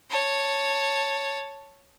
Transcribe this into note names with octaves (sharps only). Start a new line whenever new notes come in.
C#5 A5